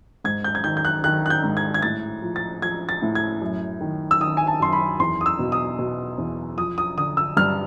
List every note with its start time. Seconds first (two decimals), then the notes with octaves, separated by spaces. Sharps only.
0.24 G#2 G#6
0.44 G6
0.55 G#6
0.64 D#3 G6
0.77 G6
0.85 F#6
1.04 D#3 F#6
1.26 F#6
1.30 G6
1.44 G#2
1.57 G#6
1.74 G#6
1.82 A2 A6
2.22 F3
2.36 A6
2.62 F3 G#6
2.89 A6
3.02 A2
3.15 G#6
3.42 F#2
3.80 D#3
4.11 E6
4.21 D#3 D#6
4.37 G#5
4.47 A5
4.60 F#2 C6
4.73 B5
5.00 E2 C6
5.21 D#6
5.26 E6
5.39 B2
5.52 D#6
5.79 B2
6.18 E2
6.57 F3 D#6
6.78 D#6
6.97 D3 D#6
7.17 E6
7.37 G2 F6